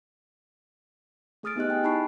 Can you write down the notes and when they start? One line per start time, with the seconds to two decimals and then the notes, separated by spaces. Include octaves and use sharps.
1.43 A3 G#4 D#6 F6 A6 D7
1.56 B3 D#4 G4 D#5 F#6
1.70 G5 G#5
1.83 D#4 E4 A5 B5 C#6 C7